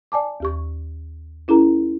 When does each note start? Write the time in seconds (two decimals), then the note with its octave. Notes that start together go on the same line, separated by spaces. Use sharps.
0.12 D5 G#5 A5 D6
0.40 D#2 G4 C#6
1.48 C#4 E4 G#4 A#4 A#5